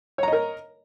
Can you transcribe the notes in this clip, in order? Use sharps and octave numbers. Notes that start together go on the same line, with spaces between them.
A#4 C#5 D#5 A#5